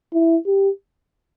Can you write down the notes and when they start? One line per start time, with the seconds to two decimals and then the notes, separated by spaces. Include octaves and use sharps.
0.13 E4
0.46 G4